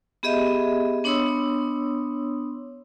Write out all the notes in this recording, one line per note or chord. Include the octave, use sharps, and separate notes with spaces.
B3 G4 G#4 D#5 E5
B3 D4 C#5 C6 D#6 E6